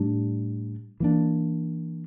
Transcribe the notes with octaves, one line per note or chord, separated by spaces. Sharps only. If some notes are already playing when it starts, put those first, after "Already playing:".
Already playing: A2 G3 D4
E3 A#3 D4